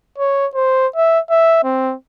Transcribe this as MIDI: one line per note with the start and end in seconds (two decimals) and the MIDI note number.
0.18 0.46 73
0.55 0.87 72
0.96 1.19 76
1.30 1.61 76
1.64 1.94 60